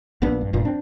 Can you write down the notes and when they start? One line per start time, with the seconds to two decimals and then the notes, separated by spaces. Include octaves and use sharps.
0.22 A#1 A#2 B3 D4
0.41 G2
0.53 E1 G2 A#2
0.65 C4 D4